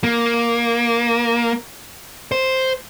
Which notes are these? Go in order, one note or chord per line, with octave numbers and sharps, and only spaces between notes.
A#3
C5